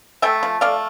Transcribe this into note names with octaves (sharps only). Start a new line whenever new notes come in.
A3 E5 G5
F3
A3 D5 F5